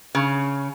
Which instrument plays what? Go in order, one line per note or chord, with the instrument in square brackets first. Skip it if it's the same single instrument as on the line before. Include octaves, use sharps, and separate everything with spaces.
[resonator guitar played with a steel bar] C#3